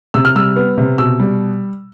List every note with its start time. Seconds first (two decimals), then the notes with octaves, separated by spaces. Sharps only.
0.14 C3 E6
0.25 F6
0.35 G3 E6
0.56 B3
0.78 C3
0.98 B2 E6
1.20 G3